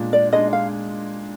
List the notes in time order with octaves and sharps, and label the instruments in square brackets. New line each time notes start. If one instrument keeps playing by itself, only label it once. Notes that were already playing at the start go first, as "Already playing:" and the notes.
Already playing: [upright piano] A#2 G#3 D4
[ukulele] D5
[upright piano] G#3 D4 [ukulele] D#5
[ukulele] F5